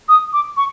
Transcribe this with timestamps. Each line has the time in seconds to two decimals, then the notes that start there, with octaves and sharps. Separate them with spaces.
0.09 D#6
0.33 D6
0.57 C#6